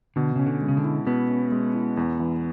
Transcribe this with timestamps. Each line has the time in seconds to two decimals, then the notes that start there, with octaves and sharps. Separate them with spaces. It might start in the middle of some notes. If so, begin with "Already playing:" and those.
0.16 B2 D3
0.36 C#3 C#4
0.46 D3
0.61 G#3
0.69 C#3
0.77 D3
0.84 E4
1.06 B2 B3
1.29 C#4
1.52 G#3
1.75 E4
1.97 E2
2.20 E3